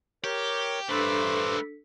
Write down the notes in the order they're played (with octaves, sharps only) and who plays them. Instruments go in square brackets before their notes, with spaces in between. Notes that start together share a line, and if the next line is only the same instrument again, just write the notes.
[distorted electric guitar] G4 [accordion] A#4 C#5 C#6
[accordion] G2 C5 D6 [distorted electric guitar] A3 B4 [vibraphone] D4 A4 E6